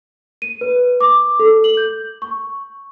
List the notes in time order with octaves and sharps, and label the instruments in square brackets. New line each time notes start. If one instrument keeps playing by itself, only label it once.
[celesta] D#7
B4
D6
A4
F#7
G6
C#6